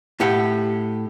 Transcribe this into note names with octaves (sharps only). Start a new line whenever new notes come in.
A2 G4 F#5